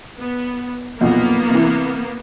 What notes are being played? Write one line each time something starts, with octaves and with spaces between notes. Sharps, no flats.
B3
B1 F2 A#2 A#3 B3
C3 E3